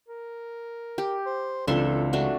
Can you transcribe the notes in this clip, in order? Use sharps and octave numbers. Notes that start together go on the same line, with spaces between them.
A#4
G4
C5
C#2 E3 C4 D4 F4 A4 E5 C6
G#3 A3 D4 F#4